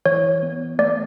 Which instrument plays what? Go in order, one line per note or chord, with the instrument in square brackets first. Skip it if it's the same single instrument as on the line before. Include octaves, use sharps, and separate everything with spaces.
[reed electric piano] E3 [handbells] C#5
[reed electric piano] B3
[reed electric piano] A3 [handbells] D5